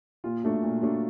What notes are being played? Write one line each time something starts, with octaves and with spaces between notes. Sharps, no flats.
A#2 F4
F#3 A3 D4
A#2
F#3 A3 D4